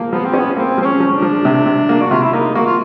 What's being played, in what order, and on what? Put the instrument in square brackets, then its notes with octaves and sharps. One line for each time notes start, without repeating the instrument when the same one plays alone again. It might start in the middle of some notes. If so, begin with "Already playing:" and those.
Already playing: [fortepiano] F3 A#3
[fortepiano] F3 [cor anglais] B3
[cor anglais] C4
[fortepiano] C#4
[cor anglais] B3
[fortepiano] A#3 [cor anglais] C4
[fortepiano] F3 [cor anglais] C4
[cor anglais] C#4
[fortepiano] F3
[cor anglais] D4
[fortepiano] F3
C3
C3
A#3
[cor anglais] F#4
[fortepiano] C3 [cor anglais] F4
[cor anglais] E4
[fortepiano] A#3 [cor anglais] D#4
[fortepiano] A#3 [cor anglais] F#4
[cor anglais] F4